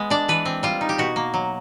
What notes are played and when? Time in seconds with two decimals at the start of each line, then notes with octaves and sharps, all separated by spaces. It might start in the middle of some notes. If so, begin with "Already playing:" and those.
Already playing: G#3 B3
0.10 D4 D5
0.28 E3 B4
0.45 C4
0.63 G3 F4
0.81 D#4
0.89 G4
0.98 B2 F#4
1.16 A#3
1.34 F#3